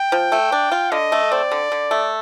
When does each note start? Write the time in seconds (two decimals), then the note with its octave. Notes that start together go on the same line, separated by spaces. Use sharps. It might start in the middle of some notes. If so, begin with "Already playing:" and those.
Already playing: G5
0.12 F3
0.32 A3
0.52 D4
0.72 F4
0.92 D3 D#5
1.12 A3
1.32 C4 D5
1.52 D3
1.72 D3
1.91 A3